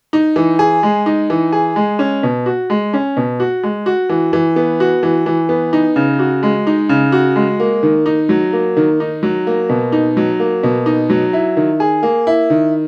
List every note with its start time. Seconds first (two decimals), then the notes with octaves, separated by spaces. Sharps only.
0.13 D#4
0.36 E3
0.59 G#4
0.83 G#3
1.06 D#4
1.30 E3
1.52 G#4
1.76 G#3
1.99 C#4
2.23 B2
2.46 F#4
2.70 G#3
2.93 C#4
3.17 B2
3.40 F#4
3.63 G#3
3.86 F#4
4.10 E3
4.33 E3
4.56 B3
4.80 F#4
5.03 E3
5.26 E3
5.49 B3
5.73 D#4
5.96 C#3
6.19 F#4
6.43 G#3
6.67 D#4
6.89 C#3
7.12 F#4
7.36 G#3
7.60 A#3
7.83 D#3
8.06 D#4
8.29 F#3
8.53 A#3
8.77 D#3
9.00 D#4
9.23 F#3
9.47 A#3
9.70 B2
9.92 D#4
10.17 F#3
10.40 A#3
10.63 B2
10.86 D#4
11.10 F#3
11.33 E4
11.57 D#3
11.80 G#4
12.03 A#3
12.27 E4
12.50 D#3